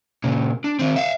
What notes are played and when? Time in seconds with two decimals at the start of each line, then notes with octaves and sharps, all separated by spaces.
0.24 A#2 C#3
0.64 D4
0.79 D#3 C4
0.96 E5 F5